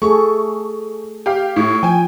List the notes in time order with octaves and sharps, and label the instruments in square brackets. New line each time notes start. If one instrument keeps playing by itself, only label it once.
[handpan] A3 G#4 A4 [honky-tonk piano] C#6
[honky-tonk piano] G4 F5
A2
[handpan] F3 [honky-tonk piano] G5 G#5